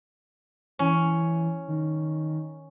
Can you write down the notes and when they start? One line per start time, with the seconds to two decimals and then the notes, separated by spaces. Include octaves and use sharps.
0.79 E3 C#4
1.68 D#3